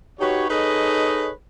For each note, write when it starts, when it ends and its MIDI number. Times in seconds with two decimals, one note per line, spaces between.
0.20 0.47 63
0.20 0.47 66
0.20 0.47 67
0.20 0.47 71
0.20 0.47 73
0.49 1.30 63
0.49 1.30 68
0.49 1.30 69
0.49 1.30 71
0.49 1.30 73
0.49 1.30 75